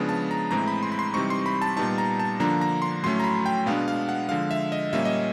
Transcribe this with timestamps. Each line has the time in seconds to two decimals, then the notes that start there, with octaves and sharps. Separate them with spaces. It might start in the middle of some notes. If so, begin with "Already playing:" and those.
Already playing: C#3 F3 G#3 B3 D4
0.09 A5
0.31 A#5
0.51 A2 E3 G#3 C4 A#5
0.68 B5
0.83 C6
0.92 B5
0.99 C6
1.14 C3 E3 G3 C4 D#4 C#6
1.30 C6
1.46 B5
1.62 A5
1.77 A#2 G3 B3 D#4 A5
1.98 A#5
2.19 A5
2.40 D3 F3 A#3 D4 A#5
2.61 A#5
2.82 C6
3.03 A2 F#3 A3 C#4 C6
3.20 A#5
3.24 B5
3.46 G5
3.66 B2 G#3 B3 D4 F5
3.88 F5
4.09 F#5
4.29 D3 F3 G#3 F5
4.51 E5
4.72 D#5
4.93 A#2 G3 A#3 C#4 E5
5.05 D#5